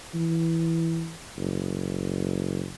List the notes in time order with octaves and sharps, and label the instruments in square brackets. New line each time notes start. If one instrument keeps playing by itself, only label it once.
[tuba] E3
F#1